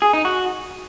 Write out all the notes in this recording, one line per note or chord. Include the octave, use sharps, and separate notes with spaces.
G#4
D#4
F#4